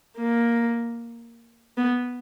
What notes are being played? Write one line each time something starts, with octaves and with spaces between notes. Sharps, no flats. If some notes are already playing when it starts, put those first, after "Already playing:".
A#3
B3